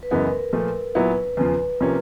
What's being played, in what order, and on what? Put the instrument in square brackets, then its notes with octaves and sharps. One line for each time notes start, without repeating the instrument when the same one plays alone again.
[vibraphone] B4
[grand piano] F#2 C#3 E3 G#3 B3 [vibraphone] A#4
[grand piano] A#2 F3 A3
[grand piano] A#2 F#3 B3 E4 [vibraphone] B4
[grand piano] E2 C#3 F3 [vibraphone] B4
[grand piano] C3 F3 A#3 C#4